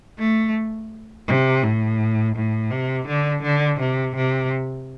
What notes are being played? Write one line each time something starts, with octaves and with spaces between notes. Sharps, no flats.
A3
C3
A2
A2
C3
D3
D3
C3
C3